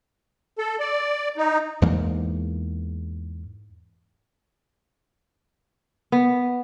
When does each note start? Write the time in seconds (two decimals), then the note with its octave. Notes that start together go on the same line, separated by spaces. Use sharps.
0.58 A4
0.80 D5
1.37 D#4
1.82 E2 G#2 E3 A#3
6.12 B3